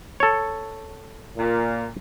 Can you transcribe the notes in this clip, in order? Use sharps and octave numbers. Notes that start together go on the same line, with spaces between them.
A4 C#5
A#2